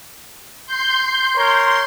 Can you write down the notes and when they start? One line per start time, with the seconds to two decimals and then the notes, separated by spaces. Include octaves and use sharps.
0.66 C6 G6
1.35 A#4 C#5